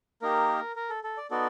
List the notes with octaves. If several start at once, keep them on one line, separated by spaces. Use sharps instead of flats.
A#3 D#4 G4 A#4
A#4
A4
A4
D5
B3 D#4 F#4 A4 D5